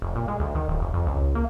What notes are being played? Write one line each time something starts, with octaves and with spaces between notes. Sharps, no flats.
F1
A#2
G#3
D2
D#3
D1
F1
F2
C#2
A#3